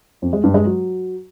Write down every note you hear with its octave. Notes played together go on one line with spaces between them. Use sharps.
F2
G#3
G2
G#3
F#3